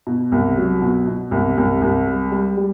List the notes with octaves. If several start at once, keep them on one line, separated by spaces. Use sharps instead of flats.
B2
C2
F#3
B2
B2
C2
C2
C2
G3
G3
G3